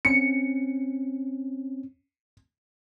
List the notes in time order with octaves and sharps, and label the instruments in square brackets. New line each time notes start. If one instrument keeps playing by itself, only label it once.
[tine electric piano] C4 C#4 [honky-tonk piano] C#7